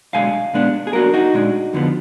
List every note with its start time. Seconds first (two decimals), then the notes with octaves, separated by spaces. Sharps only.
0.13 B1 B2 G#3 D4 F5 G#5
0.53 A#2 G#3 B3 D4
0.87 G#4
0.93 B1 B2 A#3 D4 F#4 A#4
1.14 D#4 F#4
1.34 A#2 G#3 D4
1.73 F2 D3 F3 B3